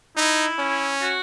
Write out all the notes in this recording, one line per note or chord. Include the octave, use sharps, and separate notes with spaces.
D#4 E4
C#4
F#4